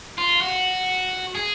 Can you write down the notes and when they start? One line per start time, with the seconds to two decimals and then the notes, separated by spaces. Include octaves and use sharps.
0.18 F4
0.41 F#4
1.35 G#4